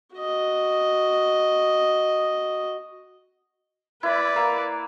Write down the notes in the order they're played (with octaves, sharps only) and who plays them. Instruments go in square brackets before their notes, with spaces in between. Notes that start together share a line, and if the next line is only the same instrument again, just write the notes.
[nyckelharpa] F#4 D#5
[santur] E4 [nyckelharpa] B4 D5
[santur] A#3